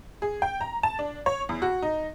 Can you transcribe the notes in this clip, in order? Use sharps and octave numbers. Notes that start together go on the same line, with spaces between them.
G#4
G5
A#5
A5
D4
C#5
E2
F#4
D#4